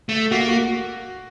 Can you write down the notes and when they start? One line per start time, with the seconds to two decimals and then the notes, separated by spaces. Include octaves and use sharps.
0.09 A3
0.31 A#3 F#4
0.48 F#4